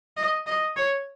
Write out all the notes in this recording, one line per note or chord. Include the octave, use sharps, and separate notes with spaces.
D#5
D#5
C#5